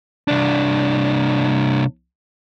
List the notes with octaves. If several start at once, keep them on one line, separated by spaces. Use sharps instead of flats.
C2 D4